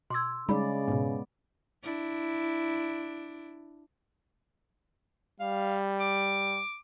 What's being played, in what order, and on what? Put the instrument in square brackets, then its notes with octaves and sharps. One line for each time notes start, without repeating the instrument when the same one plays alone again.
[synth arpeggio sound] B2 G#6 [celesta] C6 D6 E6
[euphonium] C#3 [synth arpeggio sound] G3 D#4 [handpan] G#3 D5 [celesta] B5
[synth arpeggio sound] G#2 B2 [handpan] B3
[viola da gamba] D4 E4
[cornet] G3 [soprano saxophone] F5
[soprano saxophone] D6